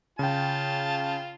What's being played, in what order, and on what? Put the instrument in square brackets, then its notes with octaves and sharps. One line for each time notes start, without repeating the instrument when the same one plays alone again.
[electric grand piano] C#3 G5 [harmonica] F4 A5